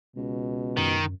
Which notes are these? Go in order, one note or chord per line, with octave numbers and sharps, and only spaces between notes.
C#2 B2
F#2 D#3